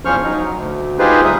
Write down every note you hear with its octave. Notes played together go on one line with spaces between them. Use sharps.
E2 F3 C#4 C5 C#6 F6
F#3 D#4
D2
D#4 F4 G4 G#4 B4 C5
D2 G3 E5 D#6